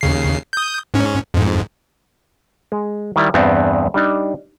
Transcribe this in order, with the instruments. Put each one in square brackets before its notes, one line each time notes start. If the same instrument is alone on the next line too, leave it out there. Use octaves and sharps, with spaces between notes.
[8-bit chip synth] D#2 C#3 C7
D#6 G6
G#2 C#4
F2 G#2
[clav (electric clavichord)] G#3
D#3 G3 E4 D5
E2 G2 B3 C4 A5
G3 D4 D#4